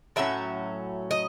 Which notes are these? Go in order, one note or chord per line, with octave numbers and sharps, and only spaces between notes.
A2 F#3 C#4 E5
D#5